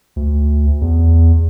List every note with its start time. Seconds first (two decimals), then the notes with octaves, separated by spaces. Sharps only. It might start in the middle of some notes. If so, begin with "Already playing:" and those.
0.16 D2
0.81 E2